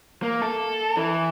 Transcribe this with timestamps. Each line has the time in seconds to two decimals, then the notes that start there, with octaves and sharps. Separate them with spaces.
0.23 A#3
0.42 A4
0.97 E3